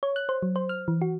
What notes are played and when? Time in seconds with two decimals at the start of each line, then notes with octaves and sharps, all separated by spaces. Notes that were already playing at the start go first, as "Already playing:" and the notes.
0.03 C#5
0.16 F#6
0.29 C5
0.42 F#3
0.56 C5
0.69 F6
0.88 E3
1.02 F#4